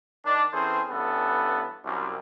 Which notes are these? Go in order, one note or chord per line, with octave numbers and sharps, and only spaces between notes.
D#3 D4
E3 C4 C#4 G#4 A4 C5
G2 E3 B3 C#4 A4
C2 F#2